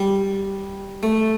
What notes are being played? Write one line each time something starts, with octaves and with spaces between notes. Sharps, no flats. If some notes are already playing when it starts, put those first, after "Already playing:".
Already playing: G3
A3